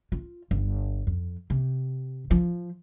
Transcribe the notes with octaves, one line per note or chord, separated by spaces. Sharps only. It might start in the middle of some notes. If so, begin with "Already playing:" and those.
F4
G1
F2
C3
F3